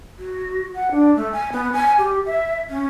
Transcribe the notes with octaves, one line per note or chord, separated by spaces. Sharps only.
F#4
F#5
D4
A3
G#5
B3
G#5
G4
E5
C#4